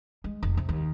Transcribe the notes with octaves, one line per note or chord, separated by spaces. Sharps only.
G#3
F1
C3
D#2